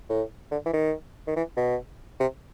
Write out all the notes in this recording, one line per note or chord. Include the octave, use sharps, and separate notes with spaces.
A2
D3
E3
D#3
D#3
E3
B2
C3